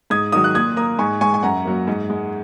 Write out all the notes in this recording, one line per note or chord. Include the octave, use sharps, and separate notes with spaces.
G#2 D#6 G#6
D#3 F#3 D#6
F#6
A#2 D#6 G#6
A#3 A#5 D#6
G#2 G#5 C#6
G#3 G#5 C#6
G#5
F#2 F#5 A#5
F#3 A#3
G#2
G#3